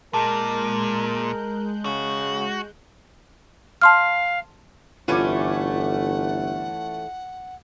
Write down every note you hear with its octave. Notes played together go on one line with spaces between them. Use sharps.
A#2 G#3 A#4 A5 F#6 G6
C#3 F#4
F5 A5 C6 F6
G1 E3 A3 C#4 F4 F#5 D6